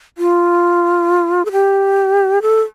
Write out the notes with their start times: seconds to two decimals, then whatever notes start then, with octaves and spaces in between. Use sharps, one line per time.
0.18 F4
1.45 A4
1.52 G4
2.42 A4